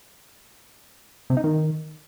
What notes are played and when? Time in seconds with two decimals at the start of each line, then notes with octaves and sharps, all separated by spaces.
1.30 C3
1.37 D#4
1.44 D#3